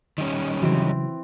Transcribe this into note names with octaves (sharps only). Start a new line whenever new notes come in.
D#3 G3 C#4
C#3 E3 F#3 C4